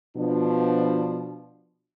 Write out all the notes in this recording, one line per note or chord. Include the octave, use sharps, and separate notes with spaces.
B2 F3 D4